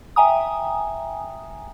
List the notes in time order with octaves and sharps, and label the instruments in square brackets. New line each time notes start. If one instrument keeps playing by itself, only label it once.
[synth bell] E5 G5 G#5 A#5 D#6